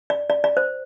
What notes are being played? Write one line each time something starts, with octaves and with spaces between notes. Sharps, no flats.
D5
D5
D5
C5